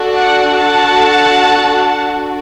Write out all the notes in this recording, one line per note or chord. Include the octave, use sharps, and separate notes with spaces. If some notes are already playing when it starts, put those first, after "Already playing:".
Already playing: D4 F#4 A4
D5 F#5
F#5 A5